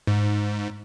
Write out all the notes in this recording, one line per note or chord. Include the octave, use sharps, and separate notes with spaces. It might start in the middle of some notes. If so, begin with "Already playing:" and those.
G#2